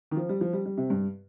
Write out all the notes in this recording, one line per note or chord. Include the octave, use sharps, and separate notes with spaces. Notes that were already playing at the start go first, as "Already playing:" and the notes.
D#3
F3
G3
F3
G3
G3
C3
G2